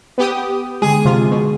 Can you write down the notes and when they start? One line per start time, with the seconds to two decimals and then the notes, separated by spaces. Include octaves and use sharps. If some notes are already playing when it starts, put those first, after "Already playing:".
0.18 B3 G4 D#6
0.82 D3 G#3 G#4
1.05 C3 F3 F4
1.31 B2